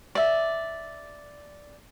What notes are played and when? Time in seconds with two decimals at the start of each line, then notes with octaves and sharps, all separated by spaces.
0.15 D5 E5